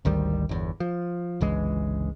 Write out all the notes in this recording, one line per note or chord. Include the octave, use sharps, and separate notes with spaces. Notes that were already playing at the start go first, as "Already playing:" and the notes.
G#1 D2 D#3 G3
G1 E2
F3
G1 C#2 E3 G#3